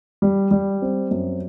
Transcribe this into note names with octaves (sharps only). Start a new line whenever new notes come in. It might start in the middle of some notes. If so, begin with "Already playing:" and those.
G3
G3
C4
F#2